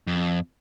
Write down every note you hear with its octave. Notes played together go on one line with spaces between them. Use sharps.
F2